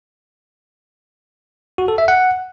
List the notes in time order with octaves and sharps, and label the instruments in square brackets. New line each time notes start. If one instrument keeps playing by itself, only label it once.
[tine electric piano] F#4
A4
E5
F#5